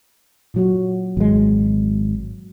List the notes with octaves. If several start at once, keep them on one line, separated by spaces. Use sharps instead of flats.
A#2 F#3 F#4
G#1 G#3